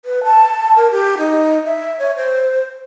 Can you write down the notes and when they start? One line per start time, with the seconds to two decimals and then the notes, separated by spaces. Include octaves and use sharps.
0.05 B4
0.24 A5
0.76 A#4
0.91 G4
1.18 D#4
1.66 E5
1.99 C#5
2.16 C5